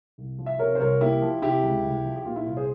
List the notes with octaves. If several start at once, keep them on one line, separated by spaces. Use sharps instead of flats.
C2
F3
E5
C3 A#4 C#5
C5
C2 A#4 C#5
A#3 E4 G4
F3
C3 E4 G4
C#2
C2
F3
G4
A#2 F4
E4
C2 F4
G#4 C5